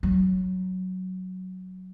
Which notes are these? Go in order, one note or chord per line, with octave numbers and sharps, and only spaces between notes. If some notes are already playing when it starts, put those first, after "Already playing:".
F#3